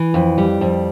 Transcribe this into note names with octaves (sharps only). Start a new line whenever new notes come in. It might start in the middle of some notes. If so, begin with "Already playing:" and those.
Already playing: E3
F2
G3
F2